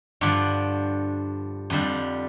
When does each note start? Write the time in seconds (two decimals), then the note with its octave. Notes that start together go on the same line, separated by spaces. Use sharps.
0.21 G2 D3 F3 D5
1.70 F2 D3 G3